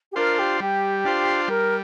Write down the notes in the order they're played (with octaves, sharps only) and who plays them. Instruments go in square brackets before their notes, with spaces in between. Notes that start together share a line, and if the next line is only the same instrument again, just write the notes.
[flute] G4
[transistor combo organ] D4 F4 C5 [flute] A#4
[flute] G4
[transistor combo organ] G3 [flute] G4
[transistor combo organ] D4 F4 C5
[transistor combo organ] G3 [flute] A#4